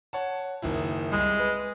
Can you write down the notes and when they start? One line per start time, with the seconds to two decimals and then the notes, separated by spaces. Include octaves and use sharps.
0.13 C#5 F#5 A5
0.62 F#1 D#3 E4
1.12 C2 G#3
1.40 B4